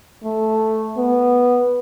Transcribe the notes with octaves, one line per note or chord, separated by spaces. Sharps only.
A3
B3